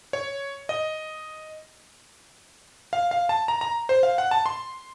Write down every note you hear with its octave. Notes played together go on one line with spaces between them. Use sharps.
C#5
D#5
F5
F5
A5
A#5
A#5
C5
F5
F#5
A5
C6